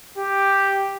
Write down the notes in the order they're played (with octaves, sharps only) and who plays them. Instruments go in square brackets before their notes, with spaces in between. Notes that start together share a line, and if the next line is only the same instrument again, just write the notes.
[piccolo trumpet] G4